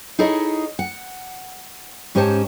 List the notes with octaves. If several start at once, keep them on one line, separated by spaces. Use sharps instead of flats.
D#4 E4 G#4 A4 C#5 D#5
F#5
G#2 C#4 G4 C5 C#5 A5